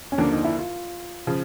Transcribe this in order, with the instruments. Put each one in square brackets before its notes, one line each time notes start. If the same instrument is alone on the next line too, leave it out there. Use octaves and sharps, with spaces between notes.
[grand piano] C#4
[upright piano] D#2 D3 F3 A#3 [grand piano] D4
[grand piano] D#4
E4
F4
[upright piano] C#3 F3